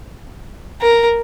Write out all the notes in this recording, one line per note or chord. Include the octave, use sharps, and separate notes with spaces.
A#4